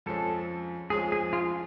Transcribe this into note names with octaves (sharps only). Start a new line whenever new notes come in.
F2 F3 G#3 C#4 A4
F2 F3 G#3 C#4 G#4
G#4
F4